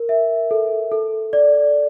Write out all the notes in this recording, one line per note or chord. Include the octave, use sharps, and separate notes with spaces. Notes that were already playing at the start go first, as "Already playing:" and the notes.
Already playing: A#4
E5
A4
A4
D5